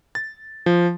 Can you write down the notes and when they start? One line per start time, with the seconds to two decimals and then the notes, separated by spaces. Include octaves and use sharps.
0.15 A6
0.66 F3